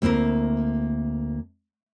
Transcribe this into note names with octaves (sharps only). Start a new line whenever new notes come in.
D2 A#3 C4 E4 A#4